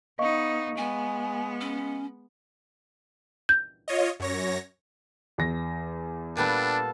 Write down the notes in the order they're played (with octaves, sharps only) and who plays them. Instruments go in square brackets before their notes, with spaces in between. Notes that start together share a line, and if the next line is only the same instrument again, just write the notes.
[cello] B3 D#4 [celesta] D#5 F5 C#6
[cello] G#3 B3 [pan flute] G#5
[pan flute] C#4
[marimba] G6
[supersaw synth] F4 C#5 D#5
F#2 C#5 A#6
[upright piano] E2 A#6
[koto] A#2 G3 B3 [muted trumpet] D4 [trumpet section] A4 F5 A5